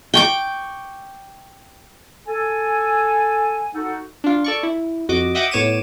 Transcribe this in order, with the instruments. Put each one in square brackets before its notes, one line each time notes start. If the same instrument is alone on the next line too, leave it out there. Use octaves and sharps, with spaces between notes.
[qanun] G5 C#6 D6
[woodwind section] A4 G#5
D#4 F#4 A4 F#5
[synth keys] D4 F4
A4 D5 C#6
E4
F2 F#4 D#5 D6
D#5 E5 F#5 G5 D6 D#6
A2 B3 C#5 D6 D#7 E7